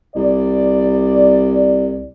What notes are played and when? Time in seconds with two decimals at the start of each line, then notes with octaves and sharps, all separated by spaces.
0.16 C2 D5